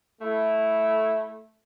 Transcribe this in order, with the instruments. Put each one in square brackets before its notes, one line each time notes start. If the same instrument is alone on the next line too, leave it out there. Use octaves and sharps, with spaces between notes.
[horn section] A3 E4